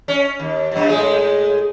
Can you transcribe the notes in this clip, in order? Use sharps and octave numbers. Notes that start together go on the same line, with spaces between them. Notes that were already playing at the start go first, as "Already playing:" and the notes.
C#4
D#2
F#2 B2
A2 G#3 G#4